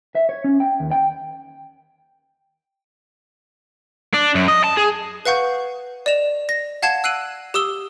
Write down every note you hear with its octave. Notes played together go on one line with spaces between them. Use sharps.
E5
C#5
C#4
G5
D#2
G5
D4
F#2
D#5
A5
G#4
B4 F5 F#5 C#6 G6
D5 D#5 E7 F7
A#6
F5 F#5 A5 G#6 C7 E7
E6 F#6 C7 D7 D#7 F#7
G4 D#6 E6 G7